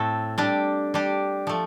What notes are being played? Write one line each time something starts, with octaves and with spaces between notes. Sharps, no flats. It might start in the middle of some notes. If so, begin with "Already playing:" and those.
Already playing: A2 A3 C4 A4
G3 D4 G4
G3 D4 G4
F3 A3